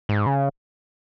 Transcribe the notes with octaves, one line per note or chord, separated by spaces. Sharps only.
G#2
C#3